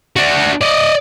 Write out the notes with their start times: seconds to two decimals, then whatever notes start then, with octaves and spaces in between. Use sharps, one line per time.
0.16 D4 F#4
0.61 D5 D#5